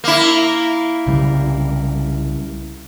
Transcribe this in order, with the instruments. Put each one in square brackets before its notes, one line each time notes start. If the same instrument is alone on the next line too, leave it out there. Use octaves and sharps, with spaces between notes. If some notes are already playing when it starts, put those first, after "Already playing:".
[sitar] A#3 E4
[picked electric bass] C2 C#3 G3